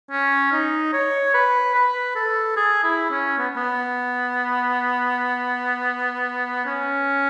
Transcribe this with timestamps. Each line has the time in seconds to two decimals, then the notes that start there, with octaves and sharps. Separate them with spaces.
0.11 C#4
0.52 D#4
0.93 C#5
1.34 B4
1.75 B4
2.16 A4
2.57 G#4
2.84 E4
3.11 C#4
3.39 B3
3.57 B3
6.65 C#4